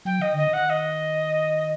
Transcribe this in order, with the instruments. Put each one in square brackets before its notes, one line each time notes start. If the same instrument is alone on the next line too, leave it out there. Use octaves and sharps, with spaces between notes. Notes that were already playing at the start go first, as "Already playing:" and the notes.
[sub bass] F#3 [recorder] G5
[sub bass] D#3 [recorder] D#5
[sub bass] D3 [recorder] D#5
[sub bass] D#3
[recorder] F#5
D#5